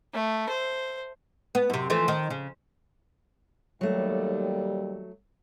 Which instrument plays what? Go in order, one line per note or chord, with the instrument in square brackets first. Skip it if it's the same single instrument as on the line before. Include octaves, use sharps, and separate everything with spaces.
[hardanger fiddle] A3
C5
[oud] B3
F#2 C3
E3 F3 A3
D#3
C#3
[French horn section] D#2 G3 [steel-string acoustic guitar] F#3 A3